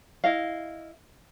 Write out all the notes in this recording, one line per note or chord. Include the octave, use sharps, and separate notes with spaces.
E4 D#5 F5